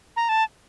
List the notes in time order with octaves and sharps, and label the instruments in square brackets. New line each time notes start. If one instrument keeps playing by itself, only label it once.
[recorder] A#5
A5